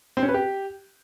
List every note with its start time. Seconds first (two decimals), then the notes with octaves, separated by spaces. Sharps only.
0.17 C4
0.23 C#4
0.28 B4
0.34 G4